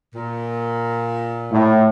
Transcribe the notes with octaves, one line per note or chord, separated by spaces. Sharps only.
A#2
A2